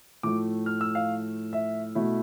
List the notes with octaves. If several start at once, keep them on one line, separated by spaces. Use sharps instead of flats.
A2 F3 A3 D6
F6
E6
F5
E5
B2 A3 E4